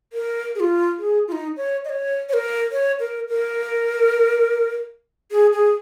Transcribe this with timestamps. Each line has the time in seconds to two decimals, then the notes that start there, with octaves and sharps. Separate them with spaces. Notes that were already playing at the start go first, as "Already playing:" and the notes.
0.13 A#4
0.55 G#4
0.60 F4
0.99 G#4
1.28 F4
1.32 D#4
1.57 C#5
1.84 D#5
1.89 C#5
2.29 C#5
2.33 A#4
2.72 C#5
3.00 A#4
3.29 A#4
5.31 G#4
5.52 G#4